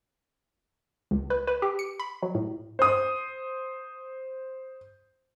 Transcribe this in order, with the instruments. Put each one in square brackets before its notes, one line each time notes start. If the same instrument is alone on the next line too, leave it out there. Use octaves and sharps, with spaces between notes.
[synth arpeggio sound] C#2
B4
B4
G4
C#7
B5
F#3
A2
[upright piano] C5 D#6